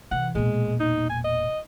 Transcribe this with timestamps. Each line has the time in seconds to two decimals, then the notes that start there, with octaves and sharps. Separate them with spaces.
0.11 C3 E3 F#5
0.35 E1 A#2 G#3
0.80 D#4
1.10 G#5
1.24 D#5